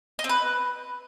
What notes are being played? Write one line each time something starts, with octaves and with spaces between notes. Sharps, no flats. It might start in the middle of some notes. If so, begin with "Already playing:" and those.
D#5
C4
B4